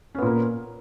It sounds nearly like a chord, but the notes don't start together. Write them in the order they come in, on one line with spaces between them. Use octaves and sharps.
C#4 B3 A#2 A#3